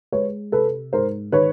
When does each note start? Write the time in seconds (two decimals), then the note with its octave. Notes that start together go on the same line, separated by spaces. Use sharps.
0.12 G#3 B4 C#5
0.52 C3 A4 B4
0.93 G#2 A#4 C5
1.32 D#3 B4 C#5